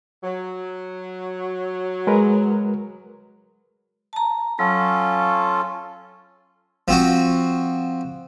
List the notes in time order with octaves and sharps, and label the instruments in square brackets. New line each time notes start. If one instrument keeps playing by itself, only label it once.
[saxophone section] F#3
[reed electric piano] G#3 A#4 B4
[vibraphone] A5 A#5
[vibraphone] F#3 [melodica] C#4 F4 A4
[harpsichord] F3 C4 F#4